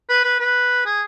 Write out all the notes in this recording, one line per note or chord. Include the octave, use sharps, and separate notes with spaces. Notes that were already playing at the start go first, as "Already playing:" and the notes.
B4
B4
B4
G#4